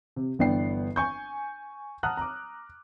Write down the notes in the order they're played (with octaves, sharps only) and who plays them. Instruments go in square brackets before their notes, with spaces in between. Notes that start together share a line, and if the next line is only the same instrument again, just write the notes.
[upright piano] C3
G1 E3 B3 D4 G5 C7
G#5 C#6 G6
F#5 A5 A#5 D#6 F6 F#6
A#5 D6